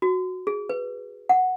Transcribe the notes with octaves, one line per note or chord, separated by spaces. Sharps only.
F#4
G#4
B4
F#5